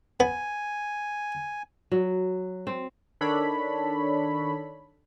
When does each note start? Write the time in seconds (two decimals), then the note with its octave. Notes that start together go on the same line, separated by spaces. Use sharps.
0.20 B3 G#5
1.92 F#3
2.67 C4
3.21 D#3 D4 A4 C#5 B5